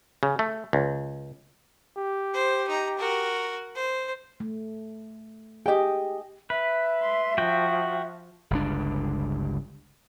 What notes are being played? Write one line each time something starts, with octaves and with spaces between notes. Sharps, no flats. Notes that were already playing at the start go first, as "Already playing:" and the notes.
C#3
A3
C#2
G4
C5
D#4 A#5
F#4 A#4
C5
A3
G4 G#4 D#5 G5
B4 E5
C6
F3 F#4 G5
G1 C#2 D4